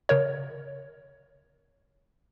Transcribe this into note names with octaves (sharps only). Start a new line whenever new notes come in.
C#3 A#4 C#5